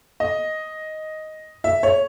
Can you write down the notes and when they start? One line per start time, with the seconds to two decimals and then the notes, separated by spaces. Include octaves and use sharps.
0.20 D#5
1.64 E5
1.83 C#5